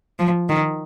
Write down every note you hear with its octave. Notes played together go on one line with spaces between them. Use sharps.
F3
D#3